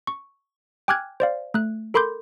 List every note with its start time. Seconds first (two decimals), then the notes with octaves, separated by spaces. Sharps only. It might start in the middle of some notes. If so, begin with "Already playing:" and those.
0.07 C#6
0.88 G5 G#5 D6 F6 F#6 G#6
1.20 C5 D5 F5
1.54 A3 F#6
1.94 A4 A#4 B5 C6 D6 G6